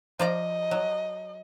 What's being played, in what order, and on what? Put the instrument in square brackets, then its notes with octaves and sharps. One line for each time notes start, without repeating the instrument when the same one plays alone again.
[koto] F3 D5 A#5 [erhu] D#5
[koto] F#3